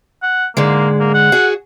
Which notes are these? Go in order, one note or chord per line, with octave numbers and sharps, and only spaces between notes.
F#5
G#2 D3 G#3 A#3
A#3
F#5
F#4 G#4